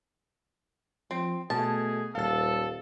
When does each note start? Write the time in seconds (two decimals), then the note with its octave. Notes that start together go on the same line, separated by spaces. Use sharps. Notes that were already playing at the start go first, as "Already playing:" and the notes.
1.11 F3 C4
1.50 B2 A3 G#4 A5
2.15 D#1 A4 F5 A6